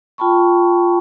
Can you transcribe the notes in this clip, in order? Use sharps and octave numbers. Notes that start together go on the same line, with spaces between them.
F4 G5 A5 B5 C#6